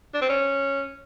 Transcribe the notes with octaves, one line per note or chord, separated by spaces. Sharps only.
D4
C4
C#4